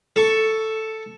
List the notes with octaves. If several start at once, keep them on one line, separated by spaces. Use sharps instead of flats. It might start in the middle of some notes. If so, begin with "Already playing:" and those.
A4 C#6